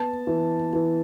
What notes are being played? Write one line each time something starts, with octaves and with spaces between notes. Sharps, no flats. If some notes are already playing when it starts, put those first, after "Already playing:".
Already playing: B3 A5
E3
E3